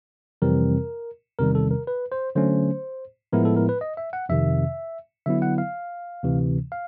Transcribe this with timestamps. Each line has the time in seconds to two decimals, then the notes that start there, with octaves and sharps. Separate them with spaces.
0.42 F2 C3 E3 G3 C4 A#4
1.39 E2 C3 D#3 G3 A#4
1.55 A4
1.71 A#4
1.87 B4
2.12 C5
2.35 D3 F#3 A3 C#4 C5
3.33 A2 F3 G#3 B3 E4 A#4
3.45 A4
3.56 A#4
3.69 B4
3.81 D#5
3.97 E5
4.13 F#5
4.29 F2 C3 D#3 E5
5.26 D3 F#3 B3 E4 E5
5.42 F#5
5.58 F5
6.23 D2 C3 E3
6.72 F5